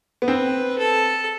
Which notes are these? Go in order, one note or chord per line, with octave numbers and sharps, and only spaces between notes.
B3
C4 B4
A4